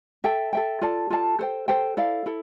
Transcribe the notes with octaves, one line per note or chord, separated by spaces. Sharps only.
A4 E5 G5
A4 E5 G5
F4 A4 D5 A5
F4 A4 D5 A5
A4 C5 G5
A4 C5 G5
E4 A4 D5 F5
E4 A4